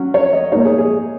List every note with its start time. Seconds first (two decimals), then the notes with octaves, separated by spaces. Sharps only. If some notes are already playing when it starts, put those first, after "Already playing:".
Already playing: F#3 C#4
0.14 C#5
0.33 D#5
0.52 A#2 A#3 D#4 C#5
0.65 G#4
0.78 G#4